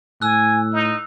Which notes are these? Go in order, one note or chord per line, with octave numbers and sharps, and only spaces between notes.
A2 G#5 E6 F#6
D#4